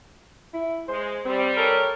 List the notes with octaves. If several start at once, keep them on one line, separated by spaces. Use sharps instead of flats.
E4
G#3 C5
G3 C4
A4 A#4 C#5